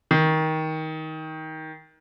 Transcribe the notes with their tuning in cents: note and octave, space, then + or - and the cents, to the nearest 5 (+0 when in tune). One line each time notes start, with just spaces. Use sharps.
D#3 +20